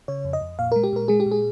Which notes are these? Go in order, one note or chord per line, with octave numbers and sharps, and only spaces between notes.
C#3 C#5
F2
D#5
F2
A#2 F5
G#3 A#4
G4
A#2 A#4
G#3 G#4
G4
A#2
G#4